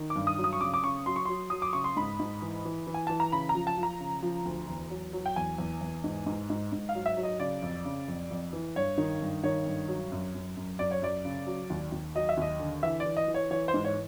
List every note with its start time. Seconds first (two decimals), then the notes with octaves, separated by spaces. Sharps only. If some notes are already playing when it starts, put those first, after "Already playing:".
Already playing: D#3
0.10 D6
0.16 G2
0.27 D#6
0.38 F#3
0.44 D#6
0.53 C#6
0.61 C#3 D6
0.74 D6
0.83 C#3 C#6
1.06 F#3 C6
1.16 C#6
1.25 F#3 C6
1.50 F#3 D#6
1.62 D6
1.73 C#3 C#6
1.84 C6
1.96 G#2 B5
2.19 G#2
2.42 E3
2.65 E3
2.87 E3
2.94 G#5
3.07 E3 A5
3.20 A#5
3.32 C#3 B5
3.49 A#5
3.55 F3
3.67 A5
3.78 F3
3.83 A#5
4.00 C#3
4.23 F3
4.45 D2
4.69 E2
4.91 F#3
5.13 F#3
5.26 G5
5.36 E2 G#5
5.58 E2
5.81 E2
6.04 G#2
6.26 G#2
6.50 G#2
6.72 G#2
6.89 F5
6.95 F#3
7.06 E5
7.17 F#3
7.23 D#5
7.40 C#3 D5
7.62 F2
7.85 C#3
8.08 F2
8.31 F2
8.53 E3
8.76 G2 C#5
8.98 D#3
9.21 G2
9.44 D#3 C#5
9.66 G2
9.88 F#3
10.12 F#2
10.34 F#2
10.56 F#2
10.79 F#2 D5
10.91 C#5
11.02 F#2 D5
11.25 C#3
11.47 F#3
11.70 D#2
11.92 D#2
12.15 F#3 D#5
12.29 E5
12.37 D#2 D#5
12.60 D3
12.83 E3 E5
13.00 D5
13.05 E3
13.17 D#5
13.28 E3
13.34 C#5
13.51 E3 C#5
13.68 C5
13.74 G#2
13.84 C#5